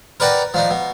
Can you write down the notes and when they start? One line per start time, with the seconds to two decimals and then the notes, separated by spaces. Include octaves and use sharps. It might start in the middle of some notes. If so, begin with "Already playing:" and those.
0.20 A#4 B4 D5 F#5 G5 A#5
0.54 F3 D4 D#4
0.70 B2